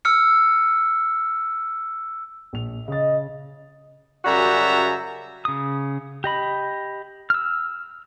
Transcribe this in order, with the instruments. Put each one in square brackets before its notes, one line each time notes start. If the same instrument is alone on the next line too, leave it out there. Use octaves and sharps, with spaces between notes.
[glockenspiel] E6 F6 C#7
[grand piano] A#1 F7
[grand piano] C#3 A6 [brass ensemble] D#5
[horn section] F#2 C#3 G3 F#4 E5 A#5
[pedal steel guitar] C#3 D#6
G4 D#5 B5
E6 F6